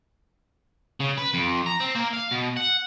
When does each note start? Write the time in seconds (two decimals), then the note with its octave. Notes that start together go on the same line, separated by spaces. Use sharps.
1.00 C#3
1.18 B4
1.34 F2
1.66 A#5
1.80 C4
1.95 A#3
2.14 F5
2.32 B2
2.57 F#5